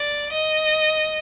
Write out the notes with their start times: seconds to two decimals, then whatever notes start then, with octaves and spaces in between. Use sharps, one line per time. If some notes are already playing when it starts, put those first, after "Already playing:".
Already playing: D5
0.32 D#5